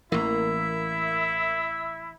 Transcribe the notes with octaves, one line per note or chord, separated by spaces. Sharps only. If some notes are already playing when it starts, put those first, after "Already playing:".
A1 E3 A#3 E4 E5